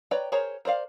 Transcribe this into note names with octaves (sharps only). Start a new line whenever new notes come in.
B4 C#5 D5 G5 A#5
G#4 A#4 C5 C#5 A#5
A#4 C5 D5 F5